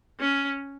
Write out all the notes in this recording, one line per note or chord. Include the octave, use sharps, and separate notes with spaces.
C#4